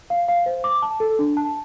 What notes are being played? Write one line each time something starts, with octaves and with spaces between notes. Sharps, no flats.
F5
F5
C5
D6
A5
A4
D4
A5